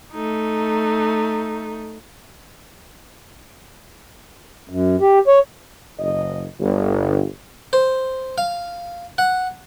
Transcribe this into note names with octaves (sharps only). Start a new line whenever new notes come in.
A3 D#4
F#2
G4
C#5
F#1 D#5
G1
C5
F5
F#5